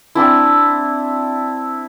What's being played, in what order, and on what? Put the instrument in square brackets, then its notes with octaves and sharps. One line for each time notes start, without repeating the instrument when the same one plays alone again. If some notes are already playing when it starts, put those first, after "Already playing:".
[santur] C4 D4 E4